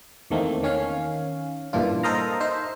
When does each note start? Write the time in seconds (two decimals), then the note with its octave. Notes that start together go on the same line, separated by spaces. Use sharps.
0.30 E2 D#3 A3 A#3 C4
0.63 D#3 C#4 C#5 F5
1.73 G2 A#2 E3 D4 F4
2.03 A4 A#4 C5 D#5 F5 A#5
2.41 D#4 C5 E5